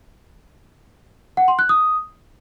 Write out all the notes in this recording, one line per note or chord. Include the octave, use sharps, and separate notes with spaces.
F#5
C6
F#6
D#6